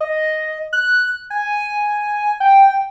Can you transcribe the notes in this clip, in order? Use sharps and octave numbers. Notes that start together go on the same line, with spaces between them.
D#5
F#6
G#5
G5